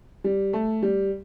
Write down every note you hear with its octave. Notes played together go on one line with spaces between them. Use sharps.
G3
A3
G3